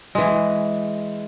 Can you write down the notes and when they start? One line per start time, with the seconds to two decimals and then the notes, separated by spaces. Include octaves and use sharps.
0.15 E3 G#3